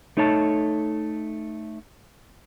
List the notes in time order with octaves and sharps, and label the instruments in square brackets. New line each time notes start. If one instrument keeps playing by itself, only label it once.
[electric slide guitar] A3 D#4 A4 C#5 G5 A5